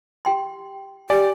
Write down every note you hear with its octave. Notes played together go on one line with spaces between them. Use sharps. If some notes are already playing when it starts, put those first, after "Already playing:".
G4 G5 C6
G4 D5 G#5